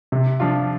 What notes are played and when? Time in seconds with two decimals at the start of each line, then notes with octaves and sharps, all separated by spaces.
0.12 C3
0.40 F3 D4 F4